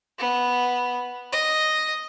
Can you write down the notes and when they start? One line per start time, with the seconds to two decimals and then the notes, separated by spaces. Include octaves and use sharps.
0.18 B3
1.32 D#5